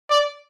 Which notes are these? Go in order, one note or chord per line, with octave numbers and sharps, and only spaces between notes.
D5